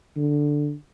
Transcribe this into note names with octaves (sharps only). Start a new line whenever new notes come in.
D3